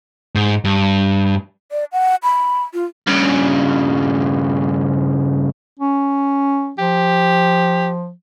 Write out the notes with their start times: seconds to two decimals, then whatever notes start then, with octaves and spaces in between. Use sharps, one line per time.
0.35 G#2
0.65 G2
1.71 D5
1.93 F#5
2.23 B5
2.74 F4
3.07 G2 C#3
5.79 C#4
6.78 F3 G4